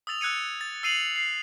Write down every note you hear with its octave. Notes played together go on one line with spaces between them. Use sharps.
D#6 E6 A6 F7
E6 F#6 G#6 C#7 D#7
A6
E6 C7 D#7 F7 F#7
C7